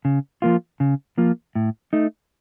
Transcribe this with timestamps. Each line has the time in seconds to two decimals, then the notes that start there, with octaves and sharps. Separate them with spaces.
0.05 C#3
0.42 F3 A#3 F4
0.80 C#3
1.18 F3 A#3 F4
1.55 A2
1.93 A3 D#4